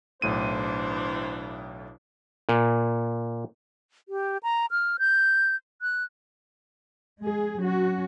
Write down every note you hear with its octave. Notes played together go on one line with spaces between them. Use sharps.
B1 A2 E3 D4 C5 D#7
A#2
G4
A#5
F6
G6
F#6
G#3 G#4
F#3 C#4 F#4